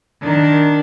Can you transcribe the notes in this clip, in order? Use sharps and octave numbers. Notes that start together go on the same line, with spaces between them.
D#3 D4